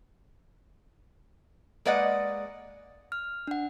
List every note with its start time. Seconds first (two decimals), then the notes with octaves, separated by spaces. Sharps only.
1.85 G#3 A#3 B4 D5 D#5 F#5
3.12 F6
3.47 D4 F#5